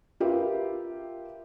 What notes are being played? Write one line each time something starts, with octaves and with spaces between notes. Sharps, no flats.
F4 G4 A#4 B4 E5